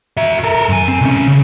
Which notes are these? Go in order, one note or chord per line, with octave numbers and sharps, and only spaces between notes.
F#4 E5
A4 A#4
F#2 G#5
C4
C2 C#4
C#3